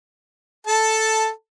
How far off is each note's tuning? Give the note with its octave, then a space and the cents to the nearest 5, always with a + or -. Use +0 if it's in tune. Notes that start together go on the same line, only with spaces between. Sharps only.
A4 +0 A5 +5